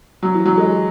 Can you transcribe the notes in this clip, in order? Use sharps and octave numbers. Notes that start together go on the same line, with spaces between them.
F#3
E3
F#3
G#3